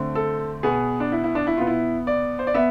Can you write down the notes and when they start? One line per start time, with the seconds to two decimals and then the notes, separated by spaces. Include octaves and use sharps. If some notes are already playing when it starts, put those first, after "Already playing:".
Already playing: D3 A3 C4
0.15 A4
0.63 B2 B3 G#4
1.00 D4
1.12 E4
1.24 E4
1.35 D4
1.47 E4
1.57 B2 B3 F4
1.67 E4
2.07 D5
2.39 C5
2.47 D5
2.54 B3 E5